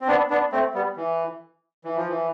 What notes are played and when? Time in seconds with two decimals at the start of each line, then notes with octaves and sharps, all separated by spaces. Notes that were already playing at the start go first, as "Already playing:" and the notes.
0.01 C4
0.08 B3 D4
0.30 B3 D4
0.52 A3 C4
0.74 G3 B3
0.97 E3
1.85 E3
1.96 F3
2.08 E3